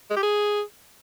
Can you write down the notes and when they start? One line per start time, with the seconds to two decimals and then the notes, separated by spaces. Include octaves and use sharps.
0.10 G#3
0.17 G4
0.23 G#4